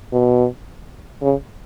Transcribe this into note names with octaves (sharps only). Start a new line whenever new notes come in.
B2
C#3